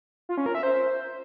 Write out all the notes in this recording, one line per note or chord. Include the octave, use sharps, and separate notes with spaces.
F4
C#4
A#4
E5
C5